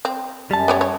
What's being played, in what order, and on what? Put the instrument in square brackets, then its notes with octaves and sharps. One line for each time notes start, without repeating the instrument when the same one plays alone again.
[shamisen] C4
[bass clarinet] F#2 [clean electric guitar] G3 A5
[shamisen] B3 G4 C#5
C#5